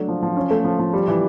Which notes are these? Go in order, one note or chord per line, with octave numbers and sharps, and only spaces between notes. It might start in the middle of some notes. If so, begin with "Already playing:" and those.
Already playing: F#3 A3 D4
F3
F3
C#4
A3
F3
F3
G3
E3